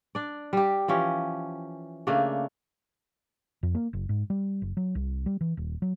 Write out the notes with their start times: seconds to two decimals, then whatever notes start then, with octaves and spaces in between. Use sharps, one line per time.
0.15 D4 D5
0.53 G3 G4
0.88 E3 F3 C#4 G4
2.07 C#3 A3 A#3 D4
3.63 F2
3.75 A#3
3.93 F#1
4.09 G#2
4.30 G3
4.62 F#1
4.77 F#3
4.95 C2
5.26 G3
5.41 E3
5.57 D#1
5.82 F#3